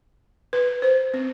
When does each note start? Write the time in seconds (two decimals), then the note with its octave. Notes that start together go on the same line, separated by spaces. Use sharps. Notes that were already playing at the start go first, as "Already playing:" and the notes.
0.53 B4
0.82 C5
1.14 C4